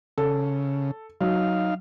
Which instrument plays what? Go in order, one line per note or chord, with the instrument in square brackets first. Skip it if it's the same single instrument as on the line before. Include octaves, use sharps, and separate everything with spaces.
[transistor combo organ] C#3 [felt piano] A4
[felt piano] F#3 [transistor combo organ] D#4 F5